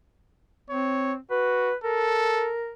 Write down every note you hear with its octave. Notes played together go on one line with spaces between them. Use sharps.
C4 C#5
F#4 B4
A4 A#4